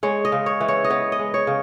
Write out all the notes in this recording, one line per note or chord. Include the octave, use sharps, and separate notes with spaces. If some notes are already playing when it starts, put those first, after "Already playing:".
G#3 C#5
D#5
C#3
C#5
E3
C#5
D#5
B3 C#5
D#5
G#3
C#5
C#3